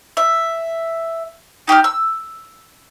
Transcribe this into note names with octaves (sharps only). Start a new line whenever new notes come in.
E5
D#4 G4 D6 F6
E6